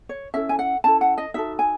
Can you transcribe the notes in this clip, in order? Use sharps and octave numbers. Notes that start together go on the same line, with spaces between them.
C#5
C#4 E4 A4 E5
G#5
F#5
C#4 E4 A4 A5
F#5
D#5
D#4 F#4 A4 E5
G#5